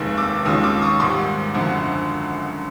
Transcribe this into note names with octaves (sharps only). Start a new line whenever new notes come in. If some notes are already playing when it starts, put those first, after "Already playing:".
Already playing: F1 D#2 D#3 G#3
D6 E6
D#2 D#3 G#3 C#4 F4 D#6 F6
D6 E6
C#6 D#6
G#1 G#2 D#3 G3 C6 D6
G#1 F#2 D3 F3